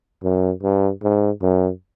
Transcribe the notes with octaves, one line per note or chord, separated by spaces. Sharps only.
F#2
G2
G#2
F#2